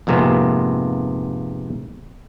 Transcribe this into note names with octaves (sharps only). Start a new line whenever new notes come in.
F2 G#2 C3 A#3 B3